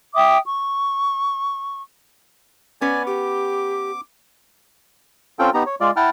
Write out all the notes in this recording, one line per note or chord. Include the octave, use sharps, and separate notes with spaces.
E5 G5 D6 D#6
C#6
B3 C#4 B4 D5 G#5
G4 D6
C4 C#4 F4 A4 G5
B3 D#4 G4 A#5
C#5
G#3 F4 D5
E4 F#5 G5 A5 F6